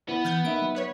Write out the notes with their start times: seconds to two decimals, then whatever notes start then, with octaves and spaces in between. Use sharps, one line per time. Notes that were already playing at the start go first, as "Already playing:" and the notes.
0.09 B3 E4
0.25 E3 F6 G6 A6
0.45 A#3 D#4 E5 D7
0.61 F#3
0.75 B3 B4 C#5